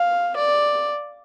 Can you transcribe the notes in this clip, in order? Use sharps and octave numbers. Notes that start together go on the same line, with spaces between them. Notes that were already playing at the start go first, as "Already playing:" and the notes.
Already playing: F5
D5